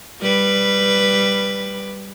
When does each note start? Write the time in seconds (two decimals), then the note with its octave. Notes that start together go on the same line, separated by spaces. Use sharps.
0.22 G3 B4